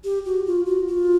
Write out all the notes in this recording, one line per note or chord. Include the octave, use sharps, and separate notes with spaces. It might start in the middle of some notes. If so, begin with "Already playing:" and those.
G4
F#4
F4
F#4
F4